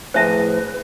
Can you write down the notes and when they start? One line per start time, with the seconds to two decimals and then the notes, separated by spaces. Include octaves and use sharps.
0.14 A2 F3 G#4 B4 C5 E5 A5